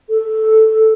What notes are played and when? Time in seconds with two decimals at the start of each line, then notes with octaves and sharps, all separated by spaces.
0.10 A4